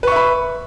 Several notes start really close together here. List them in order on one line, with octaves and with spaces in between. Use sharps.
B4 C#6 E5 B5